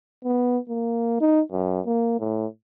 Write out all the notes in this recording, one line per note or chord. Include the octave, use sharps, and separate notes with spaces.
B3
A#3
D#4
F#2
A#3
A2